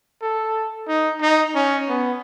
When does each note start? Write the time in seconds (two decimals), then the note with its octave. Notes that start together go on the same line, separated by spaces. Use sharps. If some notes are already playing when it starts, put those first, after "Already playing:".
0.22 A4
0.88 D#4
1.21 D#4
1.55 C#4
1.89 B3